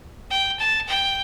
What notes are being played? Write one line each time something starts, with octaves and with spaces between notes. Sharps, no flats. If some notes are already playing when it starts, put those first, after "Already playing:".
G5
A5
G5